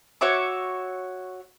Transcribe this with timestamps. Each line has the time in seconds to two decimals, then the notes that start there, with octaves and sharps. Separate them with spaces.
0.21 F#4 C#5 E5 D6